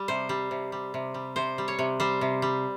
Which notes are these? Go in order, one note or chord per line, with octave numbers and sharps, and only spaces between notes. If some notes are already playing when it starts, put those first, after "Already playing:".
Already playing: G3
C3 C5
G3
C3
G3
C3
G3
C3 C5
G3
C#5
C3
G3 C5
C3
G3